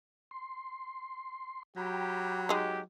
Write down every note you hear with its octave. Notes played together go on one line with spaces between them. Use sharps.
C6
F#3 G4 G5 A#5 B5
G#3 D#4 G4